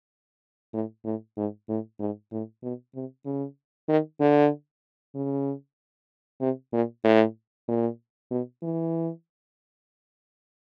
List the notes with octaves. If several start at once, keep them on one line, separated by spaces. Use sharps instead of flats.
A2
A2
G#2
A2
G#2
A2
B2
C3
C#3
D#3
D3
C#3
C3
A#2
A2
A#2
B2
E3